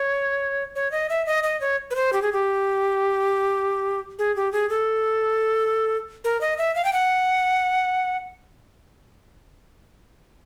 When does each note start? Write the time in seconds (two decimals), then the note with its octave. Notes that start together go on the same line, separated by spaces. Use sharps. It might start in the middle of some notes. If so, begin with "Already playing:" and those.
Already playing: C#5
0.75 C#5
0.92 D#5
1.10 E5
1.26 D#5
1.43 D#5
1.61 C#5
1.90 B4
1.95 C5
2.13 G4
2.22 G#4
2.32 G4
4.19 G#4
4.36 G4
4.52 G#4
4.69 A4
6.24 A#4
6.41 D#5
6.58 E5
6.75 F5
6.84 G5
6.93 F#5